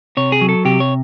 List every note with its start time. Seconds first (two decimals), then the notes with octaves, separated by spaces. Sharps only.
0.17 C3 C#5
0.32 G#4
0.41 F#3
0.49 A4
0.65 C3 G4
0.80 C#5